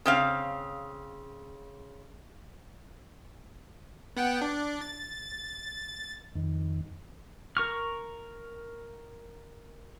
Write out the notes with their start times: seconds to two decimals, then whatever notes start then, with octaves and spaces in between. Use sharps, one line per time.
0.06 C#3 C4 F5
4.17 B3 F#5 G5
4.41 D4
4.81 A6
6.35 F2 D#3
7.57 A#4 C#6 F6